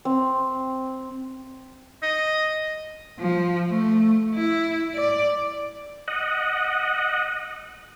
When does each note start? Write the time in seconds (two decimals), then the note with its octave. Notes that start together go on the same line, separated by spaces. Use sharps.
0.05 C4
2.03 D#5
3.19 F3
3.69 A3
4.34 E4
4.95 D5
6.08 D#5 F#5